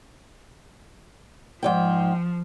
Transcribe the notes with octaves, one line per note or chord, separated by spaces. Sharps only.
G#2 D#3 F3 G5